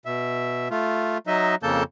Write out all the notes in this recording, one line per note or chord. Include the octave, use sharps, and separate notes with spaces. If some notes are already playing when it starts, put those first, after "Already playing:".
B2 E5
A3 F4
F#3 D#4 D#5 E5
F2 C#3 A#3 A4 A5 G6